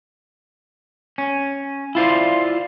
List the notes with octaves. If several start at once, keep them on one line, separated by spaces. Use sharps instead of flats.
C#4
E4 F4 C5 D5